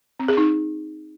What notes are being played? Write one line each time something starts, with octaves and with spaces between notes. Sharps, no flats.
C4
G#4
D#4